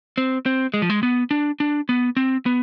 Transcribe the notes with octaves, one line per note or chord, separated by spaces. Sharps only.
C4
C4
G#3
F3
G#3
B3
D4
D4
B3
C4
B3